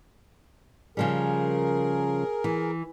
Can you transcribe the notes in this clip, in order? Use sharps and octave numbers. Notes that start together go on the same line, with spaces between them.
C#3 F3 G3 G#4 A#4
E3